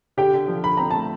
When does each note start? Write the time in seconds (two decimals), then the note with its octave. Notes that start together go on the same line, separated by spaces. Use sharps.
0.17 D3 G4 G5
0.33 D3
0.48 F3
0.64 D3 B5
0.77 C4 A#5
0.91 A3 A5